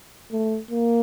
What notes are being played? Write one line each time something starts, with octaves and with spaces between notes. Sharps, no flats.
A3
A#3